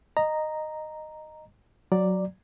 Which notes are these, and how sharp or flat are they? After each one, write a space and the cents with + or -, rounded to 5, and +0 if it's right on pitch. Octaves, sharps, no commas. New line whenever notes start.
D#5 -10 A#5 +0
F#3 +0 D5 +0 A#5 +0